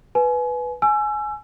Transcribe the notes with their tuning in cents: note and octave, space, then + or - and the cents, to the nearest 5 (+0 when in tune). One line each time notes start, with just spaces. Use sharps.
B4 +0 G#5 +30
G#5 +20 E6 +30